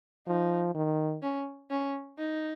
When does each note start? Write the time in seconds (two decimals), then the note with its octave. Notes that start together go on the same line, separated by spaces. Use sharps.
0.27 F3 D#4
0.75 D#3
1.22 C#4
1.71 C#4
2.18 D#4